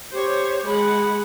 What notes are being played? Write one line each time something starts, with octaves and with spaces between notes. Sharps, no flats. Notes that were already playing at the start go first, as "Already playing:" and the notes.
G4 C5 C#5
G#3 F#5 B5